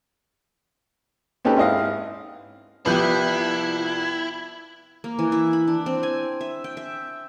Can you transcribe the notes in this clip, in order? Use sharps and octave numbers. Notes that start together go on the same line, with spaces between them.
C4 C#4 D#4 G4 A4 B4
G#2 E4 D#5 F5
C2 F3 B3 E4 G4 G6
A#3
E3
E4
B5
D4
C4
G#5
E5
G5
E5